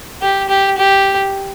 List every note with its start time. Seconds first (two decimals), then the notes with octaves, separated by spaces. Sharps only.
0.22 G4
0.49 G4
0.77 G4